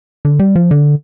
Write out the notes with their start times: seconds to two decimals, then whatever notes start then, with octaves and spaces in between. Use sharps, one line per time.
0.25 D3
0.39 G3
0.56 F3
0.71 D3